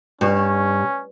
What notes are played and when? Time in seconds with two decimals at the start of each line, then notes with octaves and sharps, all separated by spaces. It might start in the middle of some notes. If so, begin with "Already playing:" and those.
0.21 G2 C#4